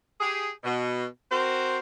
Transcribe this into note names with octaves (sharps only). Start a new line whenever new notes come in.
G4 G#4
B2
C4 F#4 A#4 C5